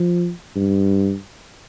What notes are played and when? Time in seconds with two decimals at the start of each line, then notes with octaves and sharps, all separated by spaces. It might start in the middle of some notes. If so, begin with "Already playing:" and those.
Already playing: F3
0.56 G2